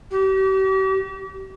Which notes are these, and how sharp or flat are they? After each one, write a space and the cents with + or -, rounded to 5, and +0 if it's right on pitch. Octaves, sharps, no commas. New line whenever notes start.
G4 -40